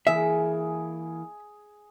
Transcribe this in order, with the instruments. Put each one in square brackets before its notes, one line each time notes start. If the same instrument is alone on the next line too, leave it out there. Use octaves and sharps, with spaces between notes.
[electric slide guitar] E3 A#3 [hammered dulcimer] G#4 [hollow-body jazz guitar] E5